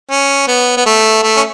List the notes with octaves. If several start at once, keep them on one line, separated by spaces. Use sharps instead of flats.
C#4
B3
B3
A3
A3
C#4